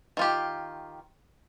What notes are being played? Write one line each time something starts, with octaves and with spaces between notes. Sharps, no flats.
D#3 F4 G4